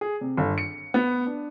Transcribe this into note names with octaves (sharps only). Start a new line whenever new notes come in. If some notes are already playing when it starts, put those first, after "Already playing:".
G#4
C3
G1
C#7
B3
D4